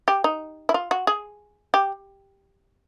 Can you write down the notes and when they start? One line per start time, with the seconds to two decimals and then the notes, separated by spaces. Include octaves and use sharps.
0.08 G4
0.24 D#4
0.69 E4
0.74 F4
0.91 F#4
1.07 G#4
1.74 G4